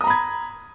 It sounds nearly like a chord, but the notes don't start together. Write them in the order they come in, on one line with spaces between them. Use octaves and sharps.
D#6 A#5 B5 G#6